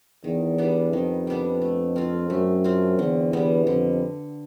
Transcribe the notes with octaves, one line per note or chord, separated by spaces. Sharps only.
E2 D#3
G3 B3 D4
F2 D#3
G3 B3 D4
A3
C4 F4
F#2 A3
C4 F4
E2 D3
E2 G3 B3
F2 D3